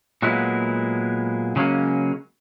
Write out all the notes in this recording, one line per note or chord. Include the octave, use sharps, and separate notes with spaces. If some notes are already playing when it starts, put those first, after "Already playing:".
A#2 F#3 G#3 A#3 B3 E4
C#3 F#3 G#3 A#3 C#4